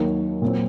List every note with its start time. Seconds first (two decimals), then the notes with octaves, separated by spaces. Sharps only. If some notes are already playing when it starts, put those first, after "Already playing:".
Already playing: D#2 D#3 F#3 A#3
0.42 A#2 F#3 C4